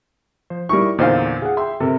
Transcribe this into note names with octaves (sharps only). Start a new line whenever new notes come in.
F3 C5
G3 D#4 E4 A#4 C#6
E2 A#2 D3 D#4 C5 F5
G#4 F5 F#5
E5 G5 C6
C3 A4 A#4